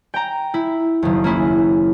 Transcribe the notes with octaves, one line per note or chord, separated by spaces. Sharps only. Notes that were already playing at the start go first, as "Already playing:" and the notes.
G5 A#5
E4
F#1 D#2
A#3 C#4 E4